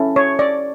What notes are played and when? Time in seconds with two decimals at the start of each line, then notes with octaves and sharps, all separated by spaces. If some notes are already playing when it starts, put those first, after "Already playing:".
Already playing: C#4 E4 A4
0.16 C#5
0.39 D5